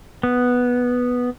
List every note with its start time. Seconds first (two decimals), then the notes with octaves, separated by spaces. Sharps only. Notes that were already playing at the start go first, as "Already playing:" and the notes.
0.23 B3